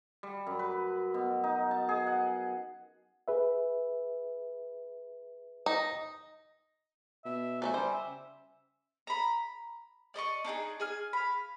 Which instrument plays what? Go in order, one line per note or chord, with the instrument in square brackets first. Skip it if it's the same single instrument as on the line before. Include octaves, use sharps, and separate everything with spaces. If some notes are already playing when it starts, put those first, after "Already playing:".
[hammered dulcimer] G3
F#2
B4
B2
D#4
A5
G#4
F#5
[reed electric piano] G#4 B4 E5
[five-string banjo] D#4
[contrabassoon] B2 [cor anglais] E5
[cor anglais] F#3 [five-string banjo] A3 D5 E5 [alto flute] G#5
[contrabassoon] C#3 [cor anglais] G3 [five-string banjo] C5
[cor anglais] E5
[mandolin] A#5 B5
D5 D#5 A#5 C#6
D4 D#4 G4 G#4
G#4 G#5 F6
F5 B5